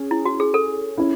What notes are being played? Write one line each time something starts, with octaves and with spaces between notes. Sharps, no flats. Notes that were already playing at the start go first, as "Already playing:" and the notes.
Already playing: C#4 G#4
E4
F#4
G#4
A4
C#4 E4